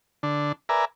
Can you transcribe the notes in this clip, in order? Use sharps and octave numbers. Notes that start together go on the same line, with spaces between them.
D3 D4
A#4 B4 D5 E5 G#5 A#5